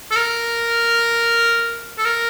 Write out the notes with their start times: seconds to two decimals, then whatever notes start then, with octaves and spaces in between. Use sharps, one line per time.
0.11 A4
0.16 A#4
1.98 A4
2.05 A#4